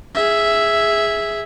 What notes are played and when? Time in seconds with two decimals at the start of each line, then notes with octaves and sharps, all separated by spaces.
0.15 G#4 E5